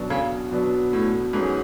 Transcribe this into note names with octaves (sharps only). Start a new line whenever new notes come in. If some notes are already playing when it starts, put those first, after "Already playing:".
Already playing: B2 F#3 B3 D4
C#3
B2 F#3 B3 D4
A2
G#2 F#3 C#4 G#4 B4